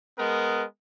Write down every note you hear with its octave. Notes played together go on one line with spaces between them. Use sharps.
G#3 B3 A#4